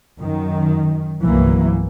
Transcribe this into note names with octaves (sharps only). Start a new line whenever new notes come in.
F#2 D#3
G1 C2 E3 F#3 A#3